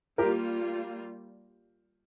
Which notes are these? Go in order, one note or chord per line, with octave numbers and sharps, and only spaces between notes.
G3 A#3 F4 G4 A#4